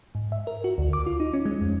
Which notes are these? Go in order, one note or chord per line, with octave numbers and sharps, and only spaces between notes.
G#2
E5
A#4
F#4
D2
D6
F4
D#4
C#4
G#3
F2